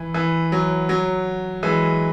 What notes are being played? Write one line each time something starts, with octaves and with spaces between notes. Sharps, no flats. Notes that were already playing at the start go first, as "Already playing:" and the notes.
Already playing: E3
E3
F#3
F#3
E3 G#3